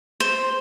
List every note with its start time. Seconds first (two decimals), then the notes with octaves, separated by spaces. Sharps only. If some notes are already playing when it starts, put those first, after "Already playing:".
0.20 C5